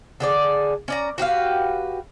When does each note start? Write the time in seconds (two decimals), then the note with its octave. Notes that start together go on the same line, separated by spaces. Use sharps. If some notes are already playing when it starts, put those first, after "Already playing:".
0.20 D3 G#4 D5
0.88 C#4 D5 A#5
1.18 F#4 G4 B4 F5